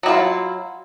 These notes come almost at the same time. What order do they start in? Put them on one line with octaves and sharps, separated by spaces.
F#3 E4 F4